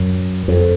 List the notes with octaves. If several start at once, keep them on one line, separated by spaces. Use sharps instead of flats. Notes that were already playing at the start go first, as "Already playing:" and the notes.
Already playing: F#2
F2